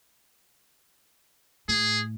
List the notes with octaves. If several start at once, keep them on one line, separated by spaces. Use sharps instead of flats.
A2 G#4